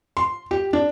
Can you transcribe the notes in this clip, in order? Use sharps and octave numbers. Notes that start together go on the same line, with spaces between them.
C6
G4
D4